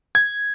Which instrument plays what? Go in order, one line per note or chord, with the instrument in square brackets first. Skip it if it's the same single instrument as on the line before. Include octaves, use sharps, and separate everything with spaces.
[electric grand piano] G#6